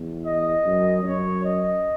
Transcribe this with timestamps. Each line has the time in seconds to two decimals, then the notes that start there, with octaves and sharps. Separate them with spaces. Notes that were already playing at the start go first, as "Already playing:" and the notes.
Already playing: E2
0.26 D#5
0.65 F#2
1.04 F#2 C#5
1.44 D#5